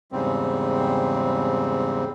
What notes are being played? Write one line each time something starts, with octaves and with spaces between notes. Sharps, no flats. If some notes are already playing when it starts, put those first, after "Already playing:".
E2 G#2 C#3 G3 C4